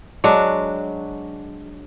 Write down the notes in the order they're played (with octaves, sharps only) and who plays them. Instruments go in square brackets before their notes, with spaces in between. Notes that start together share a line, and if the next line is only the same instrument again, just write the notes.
[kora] F#3 G#3 D4 F#4